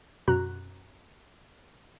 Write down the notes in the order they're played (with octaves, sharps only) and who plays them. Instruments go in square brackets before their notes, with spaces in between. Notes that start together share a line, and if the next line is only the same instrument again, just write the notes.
[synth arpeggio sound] F#2 B2 F#4 A#5 F#6